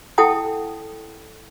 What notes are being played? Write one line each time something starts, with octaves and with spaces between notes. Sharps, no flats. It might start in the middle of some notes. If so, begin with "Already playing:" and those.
E4 A4 F#5 G5 A5 D#6